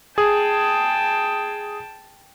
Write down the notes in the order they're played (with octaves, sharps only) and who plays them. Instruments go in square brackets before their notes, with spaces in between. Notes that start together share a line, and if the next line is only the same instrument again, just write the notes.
[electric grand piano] G#4 [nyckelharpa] G5 A5